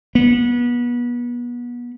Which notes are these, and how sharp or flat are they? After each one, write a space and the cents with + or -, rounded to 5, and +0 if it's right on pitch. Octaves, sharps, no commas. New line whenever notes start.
B3 -30